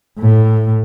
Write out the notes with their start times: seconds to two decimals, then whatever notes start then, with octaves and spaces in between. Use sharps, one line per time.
0.19 A2